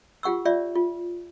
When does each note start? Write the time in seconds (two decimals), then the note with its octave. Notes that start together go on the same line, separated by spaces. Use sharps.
0.23 F4 G4 F#5 C#6 E6
0.45 F4 C#5 D5 E5
0.75 F4